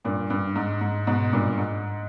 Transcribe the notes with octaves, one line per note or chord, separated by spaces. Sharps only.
G2 A#2
G2
G#2
G#2
G#2 B2
G2 A#2
G#2